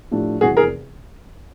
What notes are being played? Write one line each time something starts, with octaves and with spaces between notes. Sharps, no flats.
A2 F3 A3 D4 G4
F1 E2 C3 F#4 G#4
G#4 A#4